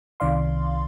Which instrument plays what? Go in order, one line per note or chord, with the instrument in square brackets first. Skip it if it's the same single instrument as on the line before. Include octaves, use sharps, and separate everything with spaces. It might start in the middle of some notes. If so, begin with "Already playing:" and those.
[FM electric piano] C2 C3 D#3 D5 F5 C6